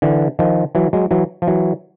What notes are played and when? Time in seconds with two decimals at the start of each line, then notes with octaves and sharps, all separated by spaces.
0.02 D3 E3
0.39 D#3 F3
0.75 E3 F#3
0.93 F#3 G#3
1.11 E3 F#3
1.42 F3
1.47 E3 F#3